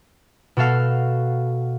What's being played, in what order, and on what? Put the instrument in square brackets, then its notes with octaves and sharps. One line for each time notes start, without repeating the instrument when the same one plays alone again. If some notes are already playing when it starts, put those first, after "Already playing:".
[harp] B2 F#4 A4 F5